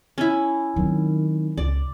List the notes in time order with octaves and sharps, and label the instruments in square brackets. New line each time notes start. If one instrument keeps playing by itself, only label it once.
[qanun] C#4 E4
[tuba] D#3 [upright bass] F#3 C4
[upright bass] C#2 [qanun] D5